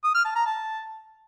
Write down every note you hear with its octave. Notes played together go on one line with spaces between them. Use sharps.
D#6
F6
A5
A#5
A5